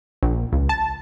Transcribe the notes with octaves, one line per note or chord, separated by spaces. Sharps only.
A#1
C#2
A5